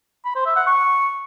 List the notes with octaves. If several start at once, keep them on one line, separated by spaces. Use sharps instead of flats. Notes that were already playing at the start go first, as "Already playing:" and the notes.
B5
C5
E5
F#5
C#6